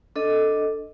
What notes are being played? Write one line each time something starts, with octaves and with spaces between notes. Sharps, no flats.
D4 A4 D#5